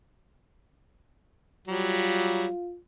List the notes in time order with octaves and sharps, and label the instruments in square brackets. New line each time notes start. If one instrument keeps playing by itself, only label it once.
[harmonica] F#3 G3 [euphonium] F4